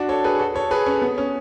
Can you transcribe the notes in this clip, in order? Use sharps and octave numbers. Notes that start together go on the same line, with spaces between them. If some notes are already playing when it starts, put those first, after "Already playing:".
Already playing: D4 F#4
A4 C#5
G#4 B4
F#4 A4
A4 C#5
G#4 B4
C#4
B3
C#4